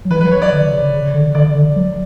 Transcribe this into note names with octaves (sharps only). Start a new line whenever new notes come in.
F#3
E3 B4
F#3 B4
C#5
D5
D3
C#3
C#3
D3
D3 D5
D3
F#3